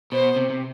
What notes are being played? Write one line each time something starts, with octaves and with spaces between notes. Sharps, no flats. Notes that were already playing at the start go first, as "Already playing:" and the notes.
B2 C5
C3
C3